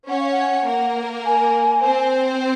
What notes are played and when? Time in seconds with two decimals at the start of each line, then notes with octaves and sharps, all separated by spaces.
0.09 C#4 C#5 F#5
0.20 F5
0.31 F#5
0.68 A#3 A#4
1.26 G#5
1.83 C4 C5